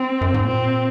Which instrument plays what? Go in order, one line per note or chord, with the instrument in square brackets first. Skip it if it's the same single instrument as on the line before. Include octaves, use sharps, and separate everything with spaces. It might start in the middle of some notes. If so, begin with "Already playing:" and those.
Already playing: [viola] C4
[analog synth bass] F#2
G#2
[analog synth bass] A#2 [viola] C4